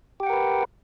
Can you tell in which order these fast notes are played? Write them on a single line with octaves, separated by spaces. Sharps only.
G4 G5 F#5 A#4 B4